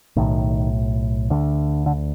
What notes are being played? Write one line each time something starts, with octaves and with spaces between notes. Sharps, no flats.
B1 A2 D#3
D2 D3
D3